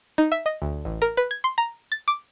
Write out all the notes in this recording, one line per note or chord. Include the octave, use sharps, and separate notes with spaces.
D#4
E5
D#5
D2
A1
A#4
B4
G#6
C6
A#5
A6
D6